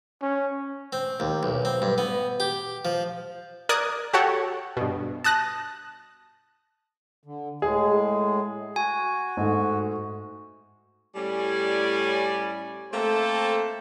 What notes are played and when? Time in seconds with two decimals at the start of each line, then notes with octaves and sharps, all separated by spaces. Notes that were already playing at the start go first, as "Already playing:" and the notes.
0.22 C#4
0.93 C4
1.20 D#2
1.43 B1
1.65 C4
1.82 G2
1.98 B3
2.40 G4
2.85 F3
3.69 A#4 D5 D#6 F#6 G#6
4.13 F#4 G4 A4 C#5 F#5
4.77 G2 B2
5.24 A5 D#6 F#6 A#6
7.23 D3
7.62 A2 G#3 G#4
8.76 F#4 G#5
9.37 G#2 A3
11.15 A2 G3 C#4 D5 G#5
12.92 A3 A#3 C4 A4 C5